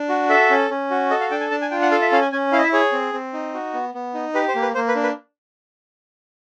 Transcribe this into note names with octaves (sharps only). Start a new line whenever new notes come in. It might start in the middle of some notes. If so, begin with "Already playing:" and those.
Already playing: D4
F#4
A4 E5
C#4
C#4
F#4
A4 D#5
F5
D4 G5
G#5
D4 A5
G#5
F4 G5
F#5
A4 F5
E5
C#4 F5
G#5
C#4 G#5
E4 F5
D#5
E5
G#4 C#5
C4
C4
D#4
F#4
B3
B3
D#4
G4 B4
C5
A#3
B4
A#3 C5
B4
D4
B4